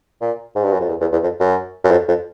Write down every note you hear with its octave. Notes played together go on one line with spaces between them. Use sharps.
A#2
G#2
G2
F#2
F2
E2
E2
E2
F2
F#2
F#2
F2
F2